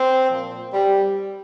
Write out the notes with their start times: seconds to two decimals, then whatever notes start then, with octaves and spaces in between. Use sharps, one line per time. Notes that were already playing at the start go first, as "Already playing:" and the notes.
Already playing: C4
0.30 A#2 F3
0.73 G3